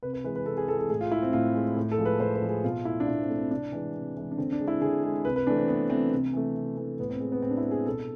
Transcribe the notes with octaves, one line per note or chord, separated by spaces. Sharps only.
C3 B4
B4
E3 G#3 B4
B4
C3 A4
G#4
E3 G#3 A4
A4
A2 G#4
F4
G#3 E4
C4
A2 F4
G#3
A2
A4
F3 G#3
B4
A2 C5
B4
F3 G#3
G#4
B2 F4
A3 E4
D4
B2 E4
C4
A3
C4
C3 D4
E3 G#3
C3
E3 G#3
D4
D3 C4
D4
G#3
E4
D3 G#4
G#3
C3 B4
B4
E3 A3 D4
C4
C3 B3
E3 A3 C4
C3
E3 A3
C3
E3 A3
A2 B3
C4
G#3
B3
A2 C4
D4
E4
G#3
G#4
B2 A4